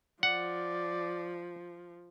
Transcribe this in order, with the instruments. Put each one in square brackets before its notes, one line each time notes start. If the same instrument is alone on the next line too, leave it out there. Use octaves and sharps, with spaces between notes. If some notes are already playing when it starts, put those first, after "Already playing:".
[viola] F3 [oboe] D5 [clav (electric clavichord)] F#5